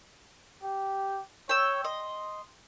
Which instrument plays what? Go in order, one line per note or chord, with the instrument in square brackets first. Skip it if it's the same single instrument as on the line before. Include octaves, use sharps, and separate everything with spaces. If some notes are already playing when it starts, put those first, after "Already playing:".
[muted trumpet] G4
[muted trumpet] C#5 [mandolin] G5 E6
[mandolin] D#5 [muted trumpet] C6